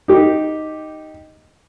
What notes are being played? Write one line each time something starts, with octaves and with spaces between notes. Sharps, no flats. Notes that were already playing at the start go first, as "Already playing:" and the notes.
D#4 G4